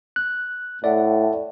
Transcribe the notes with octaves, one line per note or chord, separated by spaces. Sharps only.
F#6
A2 D5 E5 F#5